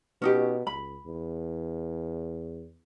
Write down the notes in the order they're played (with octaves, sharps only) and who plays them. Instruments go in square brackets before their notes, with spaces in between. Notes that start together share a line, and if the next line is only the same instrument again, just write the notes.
[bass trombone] B2 [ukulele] C#4 D#4 G4
[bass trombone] C#2 [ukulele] B5
[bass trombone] E2